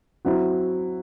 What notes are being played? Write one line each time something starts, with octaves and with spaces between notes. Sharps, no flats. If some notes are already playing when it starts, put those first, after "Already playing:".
F#3 C4 E4 F#4